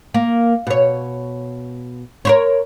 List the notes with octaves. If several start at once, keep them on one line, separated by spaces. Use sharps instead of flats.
A#3
B2 C#5
A#4 C5 C#5